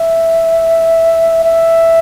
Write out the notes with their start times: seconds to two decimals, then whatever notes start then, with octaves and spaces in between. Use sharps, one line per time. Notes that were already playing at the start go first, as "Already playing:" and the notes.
Already playing: E5
1.44 E5